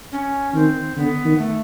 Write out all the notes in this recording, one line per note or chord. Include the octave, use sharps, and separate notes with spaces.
C#4
D#3 C4
D3 B3
D#3
A3